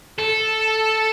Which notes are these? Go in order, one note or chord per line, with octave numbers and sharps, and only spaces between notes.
A4